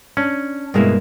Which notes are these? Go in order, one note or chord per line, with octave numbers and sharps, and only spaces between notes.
C#4 D4
G2 B2 G#3 A#3 E4